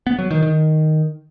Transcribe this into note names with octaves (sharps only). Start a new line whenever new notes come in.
B3
F#3
D#3
D#3